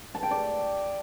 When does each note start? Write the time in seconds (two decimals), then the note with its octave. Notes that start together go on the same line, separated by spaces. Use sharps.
0.14 A5
0.23 G5
0.31 D5